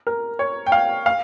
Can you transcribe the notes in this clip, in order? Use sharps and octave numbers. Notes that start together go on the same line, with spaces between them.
A#4
C#5
G5
F5
F5